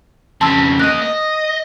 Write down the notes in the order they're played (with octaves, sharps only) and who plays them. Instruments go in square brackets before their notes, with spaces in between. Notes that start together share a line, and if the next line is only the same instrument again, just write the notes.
[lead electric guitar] F2 C#3 [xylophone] A5 C6 E6
[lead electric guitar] A#3 D#5 [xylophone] F#6 D#7
[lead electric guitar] D#5